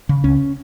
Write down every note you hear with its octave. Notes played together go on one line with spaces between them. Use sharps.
C#3
C#2 C#4